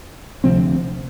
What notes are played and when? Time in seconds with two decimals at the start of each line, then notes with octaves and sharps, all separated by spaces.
0.44 D2 C3 F3 C4